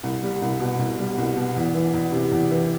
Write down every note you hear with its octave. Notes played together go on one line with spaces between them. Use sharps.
C2
G3
C2
B2
C2
G3
C2
B2
E2
E3
E2
C3
E2
E3